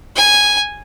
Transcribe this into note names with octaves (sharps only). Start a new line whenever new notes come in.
G#5